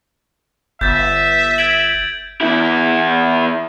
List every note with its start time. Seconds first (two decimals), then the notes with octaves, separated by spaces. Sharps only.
0.81 G1 E5 G6 A6
1.58 G#6 D7 F#7
2.41 E2 E4